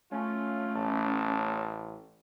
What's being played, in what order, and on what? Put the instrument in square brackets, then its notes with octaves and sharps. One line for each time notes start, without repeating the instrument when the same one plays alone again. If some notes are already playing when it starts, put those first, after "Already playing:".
[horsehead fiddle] A3 [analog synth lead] C#4 [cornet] F4
[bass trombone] A1 [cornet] A5